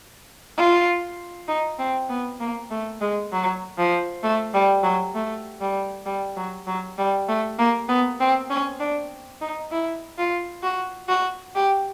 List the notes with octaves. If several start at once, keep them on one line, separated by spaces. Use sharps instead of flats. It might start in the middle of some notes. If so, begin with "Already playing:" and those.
F4
D#4
C4
B3
A#3
A3
G#3
F#3
F3
A3
G3
F#3
A3
G3
G3
F#3
F#3
G3
A3
A#3
B3
C4
C#4
D4
D#4
E4
F4
F#4
F#4
G4